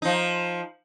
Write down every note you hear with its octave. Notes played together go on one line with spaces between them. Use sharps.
F3 D#4